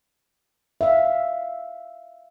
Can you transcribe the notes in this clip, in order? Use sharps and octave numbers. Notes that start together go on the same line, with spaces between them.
E5 F5